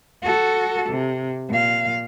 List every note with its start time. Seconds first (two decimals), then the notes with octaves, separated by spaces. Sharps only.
0.22 F#4 A4
0.89 C3
1.49 A#2 F5